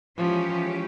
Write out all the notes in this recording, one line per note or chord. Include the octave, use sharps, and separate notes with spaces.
E3 F3 G#3 C#4 G4 C#5